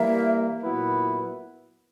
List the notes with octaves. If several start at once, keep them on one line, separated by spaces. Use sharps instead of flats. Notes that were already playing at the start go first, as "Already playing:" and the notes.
Already playing: E3 G3 A#3 E5
A#2 F#3 B3 E4 B4